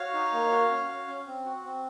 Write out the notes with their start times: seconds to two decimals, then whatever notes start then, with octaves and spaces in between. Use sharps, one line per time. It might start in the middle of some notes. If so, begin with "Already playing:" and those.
Already playing: F#4 C#5 F5
0.14 D#4
0.33 A#3
0.52 F#4
0.70 C#4
0.88 F#4
1.08 C#4
1.27 C4
1.45 F#4
1.65 C4